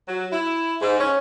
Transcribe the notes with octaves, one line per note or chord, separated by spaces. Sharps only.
F#3
E4
G#2
C#4